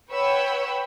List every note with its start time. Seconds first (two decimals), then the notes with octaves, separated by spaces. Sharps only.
0.12 B4 C#5 F#5 G5 B5 E6